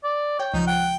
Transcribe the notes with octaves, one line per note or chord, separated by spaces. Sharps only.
D5
C#5 G5
C#2 F3 D#4
F#5 G5